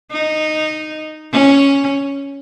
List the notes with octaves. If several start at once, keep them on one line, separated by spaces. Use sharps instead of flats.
D#4
C#4